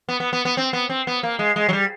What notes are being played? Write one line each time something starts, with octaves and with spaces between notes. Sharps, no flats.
B3
B3
B3
B3
C4
B3
C4
B3
A#3
G#3
G#3
F#3
G3